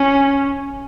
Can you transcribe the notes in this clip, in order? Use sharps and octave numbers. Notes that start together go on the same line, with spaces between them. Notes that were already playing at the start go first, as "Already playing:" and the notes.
Already playing: C#4